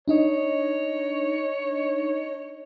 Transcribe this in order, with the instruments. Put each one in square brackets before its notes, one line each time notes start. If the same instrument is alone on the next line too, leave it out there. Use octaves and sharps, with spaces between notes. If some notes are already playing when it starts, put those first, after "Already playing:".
[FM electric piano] D4 D#4 D#5 [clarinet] C#5